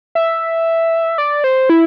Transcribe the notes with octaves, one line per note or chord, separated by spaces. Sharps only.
E5
D5
C5
E4